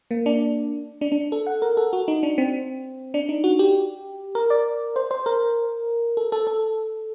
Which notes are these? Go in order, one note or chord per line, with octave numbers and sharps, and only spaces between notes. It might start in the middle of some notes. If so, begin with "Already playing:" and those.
A#3
D4
D4
D4
A4
F#5
A#4
A4
F#4
D#4
D4
C4
D4
D#4
F#4
G4
A#4
D5
C5
C5
A#4
A4
A4
A4